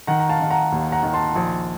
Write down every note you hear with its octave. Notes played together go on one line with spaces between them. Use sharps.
D#3 F#5 A#5
A#5
F5 A5
D#3
F#5 A#5
D#2
F#5 A#5
D#3
A5 C6
A#1